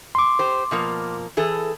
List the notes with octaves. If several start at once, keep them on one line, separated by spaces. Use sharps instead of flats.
C6 D6
G4 C5
B2 F3 A#3
E3 G#4 A4